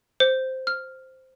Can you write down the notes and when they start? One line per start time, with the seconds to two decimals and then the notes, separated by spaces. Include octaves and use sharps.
0.20 C5
0.67 F6